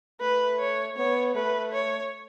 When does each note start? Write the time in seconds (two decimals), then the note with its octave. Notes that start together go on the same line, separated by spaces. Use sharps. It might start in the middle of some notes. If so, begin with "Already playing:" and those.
0.21 A3 B4
0.59 C#5
0.97 B3 C#5
1.35 A3 B4
1.72 C#5